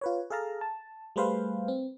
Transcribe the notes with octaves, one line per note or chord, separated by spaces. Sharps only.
F4 B4 C#5
G#4 A4 F5 A5 A#5
A5
G3 A3 G#4 B4 C5 F5
C4